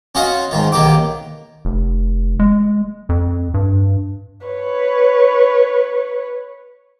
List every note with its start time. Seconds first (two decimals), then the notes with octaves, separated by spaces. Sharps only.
0.15 C#4 F4 F#4 D#5 F5 F#5
0.51 G#2 D#3 F4
0.72 B1 D#3 A#3 G4 D6
1.65 F1
2.39 G#3
3.09 F2
3.54 G2
4.47 B4 C#5